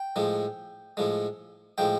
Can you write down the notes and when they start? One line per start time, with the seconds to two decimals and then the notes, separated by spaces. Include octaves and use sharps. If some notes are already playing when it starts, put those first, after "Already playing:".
Already playing: G5
0.16 A2 F3 G#3
0.97 A2 F3 G#3
1.78 A2 F3 G#3 G5